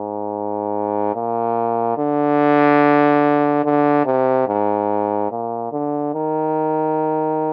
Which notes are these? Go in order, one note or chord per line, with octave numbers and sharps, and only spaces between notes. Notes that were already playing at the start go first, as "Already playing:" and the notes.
Already playing: G#2
A#2
D3
D3
C3
G#2
A#2
D3
D#3